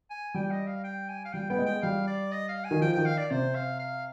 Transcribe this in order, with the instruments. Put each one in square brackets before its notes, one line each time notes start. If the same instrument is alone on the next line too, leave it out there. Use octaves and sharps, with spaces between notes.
[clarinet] G#5
[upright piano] G3 [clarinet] G5
[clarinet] D#5
F5
G5
G#5
F5
[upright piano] G3 [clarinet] G5
[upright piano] B3 [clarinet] G5
[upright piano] G#3
[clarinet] G5
[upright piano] G3 [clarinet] F5
[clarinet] D5
D#5
F5
G#5
[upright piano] D#3
[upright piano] F3 [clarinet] G5
[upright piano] D#3 [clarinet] G5
[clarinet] F5
D5
[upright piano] C3 [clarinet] C5
[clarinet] F5
F5